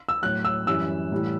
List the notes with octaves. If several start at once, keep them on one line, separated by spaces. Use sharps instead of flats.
E6
A2 F#3 F#6
E6
F#2 E3 G3 E6
A2 E3 G3